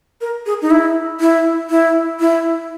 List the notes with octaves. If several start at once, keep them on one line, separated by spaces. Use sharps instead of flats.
A#4
G#4
D#4
E4
E4
E4
E4